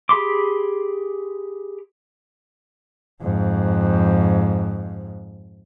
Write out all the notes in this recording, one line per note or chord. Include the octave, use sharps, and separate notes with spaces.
G4 G#4 B5 C6 D6
F2 G#2